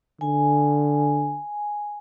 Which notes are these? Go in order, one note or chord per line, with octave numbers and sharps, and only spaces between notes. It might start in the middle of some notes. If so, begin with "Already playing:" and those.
D3 G#5